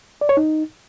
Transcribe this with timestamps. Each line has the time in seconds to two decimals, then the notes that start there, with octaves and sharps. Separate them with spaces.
0.21 D5
0.29 C#5
0.37 D#4